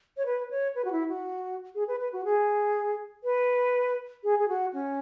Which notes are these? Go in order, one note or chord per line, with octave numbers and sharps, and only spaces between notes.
C#5
B4
C#5
B4
F#4
E4
F#4
G#4
B4
B4
F#4
G#4
B4
G#4
G#4
F#4
C#4